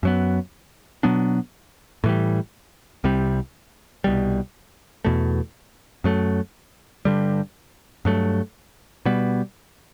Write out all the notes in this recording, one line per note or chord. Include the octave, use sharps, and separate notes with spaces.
F#2 F#3 B3
B2 F#3 B3 D4
A2 E3 G3
C2 C3 G3
C2 B2 G3
E2 B2 A3
F#2 F#3 A3
G2 D3 G3
G2 F#3 A3
B2 G3 B3